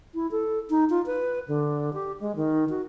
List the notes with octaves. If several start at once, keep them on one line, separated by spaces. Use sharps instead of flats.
E4
A4
D#4
F4
B4
D3
G4
G#3
D#3
F#4